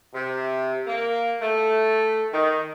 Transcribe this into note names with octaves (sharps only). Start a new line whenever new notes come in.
C3
A#3
A3
D#3